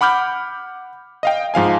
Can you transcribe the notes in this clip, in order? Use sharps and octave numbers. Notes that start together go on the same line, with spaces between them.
F#5 B5 D6 F6 G6
D#5 F5 G5
G#2 F3 F5 G#5